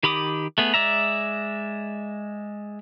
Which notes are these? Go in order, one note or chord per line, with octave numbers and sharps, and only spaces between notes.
D#3 G4 B5 D6 D#6
A3 B3 G#4
G#3 D5 E5 A#5